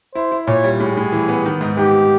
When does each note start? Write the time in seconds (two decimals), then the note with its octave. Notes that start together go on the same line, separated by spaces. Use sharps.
0.15 E4 C5
0.32 E4
0.47 A#2 C#5
0.64 G3
0.80 A2 G#4
0.97 A2
1.12 E3
1.29 B3
1.46 D#3
1.61 G#2
1.77 G#2 G4